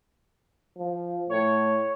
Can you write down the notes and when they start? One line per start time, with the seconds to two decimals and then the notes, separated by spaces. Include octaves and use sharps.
0.78 F3
1.30 A2 C#5